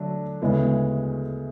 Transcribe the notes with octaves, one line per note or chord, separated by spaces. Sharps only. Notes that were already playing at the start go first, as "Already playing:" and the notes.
Already playing: D3 F#3 A3 D4
D2 C#3 G#3 B3 E4